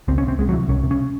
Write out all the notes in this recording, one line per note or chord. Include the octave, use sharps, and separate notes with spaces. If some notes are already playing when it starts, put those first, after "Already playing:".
C#2 C4
C#4
C3
C4
C2 G#3
F#3
C3 E3
C2 C#4
C3
C#4